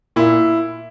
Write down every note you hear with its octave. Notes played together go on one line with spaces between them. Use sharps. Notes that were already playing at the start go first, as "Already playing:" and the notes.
A#2 E4